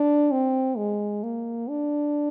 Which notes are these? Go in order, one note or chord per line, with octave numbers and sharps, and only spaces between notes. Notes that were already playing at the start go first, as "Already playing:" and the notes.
Already playing: D4
C4
G#3
A#3
D4